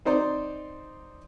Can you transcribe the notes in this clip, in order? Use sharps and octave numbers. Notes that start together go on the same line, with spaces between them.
C4 D#4 C5 D5